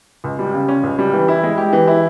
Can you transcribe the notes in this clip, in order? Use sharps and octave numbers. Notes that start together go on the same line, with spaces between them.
C#2
G3
C#3
C#4
C#2
G3
E3
E4
G#3
G4
E3
E4